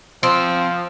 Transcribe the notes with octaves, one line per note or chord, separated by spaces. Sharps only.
F3 C4